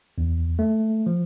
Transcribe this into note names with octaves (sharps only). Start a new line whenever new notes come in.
E2
A3
F3